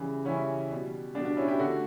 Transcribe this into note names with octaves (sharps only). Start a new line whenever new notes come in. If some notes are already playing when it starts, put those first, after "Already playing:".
Already playing: C#3 E3 G3
C#3 E3 G3 C#4 E4
B2 G3
B2 G3 D4
D4
C#4 E4
E4 G4
D3 A3 F#4 A4